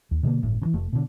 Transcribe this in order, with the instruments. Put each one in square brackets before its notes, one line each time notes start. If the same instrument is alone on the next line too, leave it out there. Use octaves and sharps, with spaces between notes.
[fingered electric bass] D#2
B2 D3 E3 A#3
G1 A2
C#3 E3
F1 A3
B2 D3